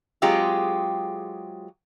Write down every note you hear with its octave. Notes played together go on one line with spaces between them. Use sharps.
F#3 G#3 C4 F4 G4 G#4